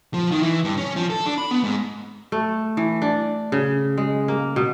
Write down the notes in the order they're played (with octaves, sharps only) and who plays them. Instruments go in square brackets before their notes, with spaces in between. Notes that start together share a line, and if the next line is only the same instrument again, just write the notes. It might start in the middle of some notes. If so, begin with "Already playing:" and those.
[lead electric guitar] F3
D#3
E3
G2
C#4
F3
A4
D4
B5
B3
G#2
[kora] A3
E3
D4
C#3
G#3
A#3
B2